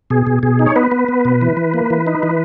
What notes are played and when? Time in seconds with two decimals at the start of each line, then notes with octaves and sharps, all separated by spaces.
0.10 B2 G#4
0.27 B2
0.43 B2 G#4
0.59 D#4
0.66 C#5
0.76 B3 B4
0.91 B3
1.08 B3
1.25 B2
1.41 E3
1.57 E3
1.74 A#3
1.90 E3
2.07 D#4
2.23 E3